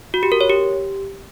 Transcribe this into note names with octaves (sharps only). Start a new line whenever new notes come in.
F#4
G4
A#4
C#5
G4